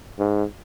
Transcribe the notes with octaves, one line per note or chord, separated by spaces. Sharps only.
G#2